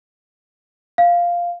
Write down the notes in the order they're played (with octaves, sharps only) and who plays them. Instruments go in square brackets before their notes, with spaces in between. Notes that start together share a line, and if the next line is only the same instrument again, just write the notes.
[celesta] F5